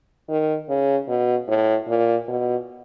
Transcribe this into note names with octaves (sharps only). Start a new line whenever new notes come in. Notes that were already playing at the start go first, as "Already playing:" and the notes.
D#3
C#3
B2
A2
A#2
B2